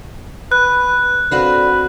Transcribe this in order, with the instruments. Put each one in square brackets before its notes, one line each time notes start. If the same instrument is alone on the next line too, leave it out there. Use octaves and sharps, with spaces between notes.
[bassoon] B4 [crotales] F#6
[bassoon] D3 [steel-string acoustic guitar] C4 F#4 F5 [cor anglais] B4